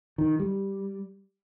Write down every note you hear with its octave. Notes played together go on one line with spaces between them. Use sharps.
D#3
G3